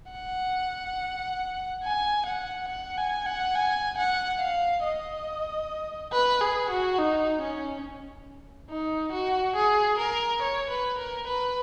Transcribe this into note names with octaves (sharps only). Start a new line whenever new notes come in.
F#5
G#5
F#5
F#5
G#5
F#5
G#5
F#5
F5
D#5
B4
G#4
F#4
D#4
C#4
D#4
F#4
G#4
A#4
C#5
B4
A#4
B4